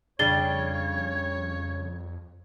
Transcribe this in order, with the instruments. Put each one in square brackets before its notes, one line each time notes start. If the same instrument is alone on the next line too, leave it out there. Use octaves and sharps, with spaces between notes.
[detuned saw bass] F2 [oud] C#3 G3 D4 [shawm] C#5 [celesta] A6 G7